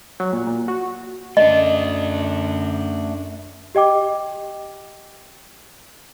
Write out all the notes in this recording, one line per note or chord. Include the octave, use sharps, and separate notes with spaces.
F#3
A#2
A#2
F#4
F#2 A3 D4 D#5
G4 D#5 G5 D6